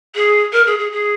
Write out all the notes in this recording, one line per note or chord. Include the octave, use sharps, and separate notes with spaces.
G#4
A#4
G#4
G#4
G#4